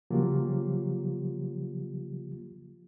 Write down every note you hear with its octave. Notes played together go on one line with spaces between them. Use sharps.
C#3 F3 F#3 A#3 F4 G4